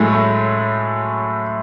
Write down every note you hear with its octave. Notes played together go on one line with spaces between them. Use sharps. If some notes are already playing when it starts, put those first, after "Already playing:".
Already playing: A2 F#3 G#3 A3
A3